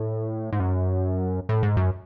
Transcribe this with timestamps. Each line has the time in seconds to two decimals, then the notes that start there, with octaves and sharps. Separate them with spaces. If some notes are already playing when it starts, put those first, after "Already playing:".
Already playing: A2
0.52 G#2
0.60 F#2
1.49 A2
1.63 G#2
1.77 F#2